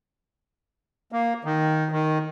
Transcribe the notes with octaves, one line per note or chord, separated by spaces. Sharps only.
A#3
D#3
D#3